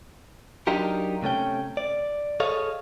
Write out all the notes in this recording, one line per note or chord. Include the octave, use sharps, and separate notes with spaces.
F#3 D4 D#4 F4 G4 A#4
C3 A3 C#4 G5
D5
G#4 A4 C#5 D#5 F5